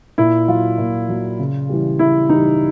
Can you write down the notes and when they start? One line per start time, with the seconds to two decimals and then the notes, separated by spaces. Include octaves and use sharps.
0.18 A#2 E4
0.48 F#3 F4
0.78 A#2
1.09 F#3
1.39 C#3
1.69 E3 G3
1.99 C#3 E4
2.29 E3 G3 D#4